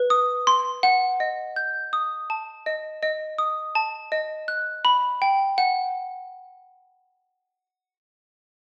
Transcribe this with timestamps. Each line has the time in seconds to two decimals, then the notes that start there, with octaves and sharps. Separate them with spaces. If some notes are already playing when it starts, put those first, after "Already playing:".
Already playing: B4
0.10 D#6
0.47 C6
0.83 F#5
1.20 D#5
1.56 G6
1.93 D#6
2.30 A5
2.66 D#5
3.03 D#5
3.38 D#6
3.75 A5
4.12 D#5
4.48 F#6
4.85 B5
5.22 G5
5.58 F#5